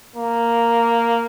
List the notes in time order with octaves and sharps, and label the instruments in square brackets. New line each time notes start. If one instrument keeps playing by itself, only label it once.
[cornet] A#3